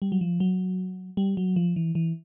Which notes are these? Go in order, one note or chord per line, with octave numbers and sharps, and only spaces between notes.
G3
F#3
F3
F#3
G3
F#3
F3
E3
E3